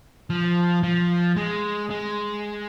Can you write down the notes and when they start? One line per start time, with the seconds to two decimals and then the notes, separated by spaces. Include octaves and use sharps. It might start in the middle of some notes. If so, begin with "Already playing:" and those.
0.30 F3
0.83 F3
1.37 G#3
1.91 G#3